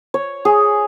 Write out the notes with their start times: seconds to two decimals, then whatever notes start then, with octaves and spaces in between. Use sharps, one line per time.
0.14 C#5
0.45 G#4